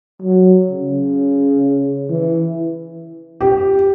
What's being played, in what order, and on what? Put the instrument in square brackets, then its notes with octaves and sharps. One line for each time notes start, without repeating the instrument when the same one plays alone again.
[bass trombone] F#3
C#3
E3
[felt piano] G4